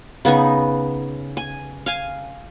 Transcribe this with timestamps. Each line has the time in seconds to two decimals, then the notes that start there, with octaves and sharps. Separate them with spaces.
0.25 C#3 B3 D#4 C#6
1.37 G#5
1.86 F5 G#5